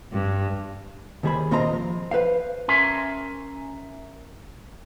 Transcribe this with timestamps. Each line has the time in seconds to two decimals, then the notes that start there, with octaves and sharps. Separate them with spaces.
0.12 G2
1.23 D#2 D#3 G3 G#4 C5 B5
1.51 D#2 A#2 C4 C5 D#5 A#5
1.73 F3
2.11 B4 C5 F5
2.68 C#4 A#4 E5 G#5 C6